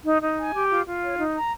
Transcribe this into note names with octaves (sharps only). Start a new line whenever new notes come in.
D#4
D#4
G#5
G4
F4
F4
C#5
D#4
A#5